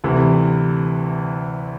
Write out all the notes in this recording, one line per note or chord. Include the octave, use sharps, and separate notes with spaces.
D2 C3 E3